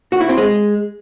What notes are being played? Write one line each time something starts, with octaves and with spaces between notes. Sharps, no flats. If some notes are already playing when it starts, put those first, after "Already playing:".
F#4
E4
C4
G#3